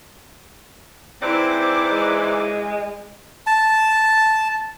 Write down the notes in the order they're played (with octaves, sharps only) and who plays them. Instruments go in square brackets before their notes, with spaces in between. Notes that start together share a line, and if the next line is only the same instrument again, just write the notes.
[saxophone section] G#2 E3 D5 [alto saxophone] C4 [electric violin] E4 D6
[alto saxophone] G#3
[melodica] A5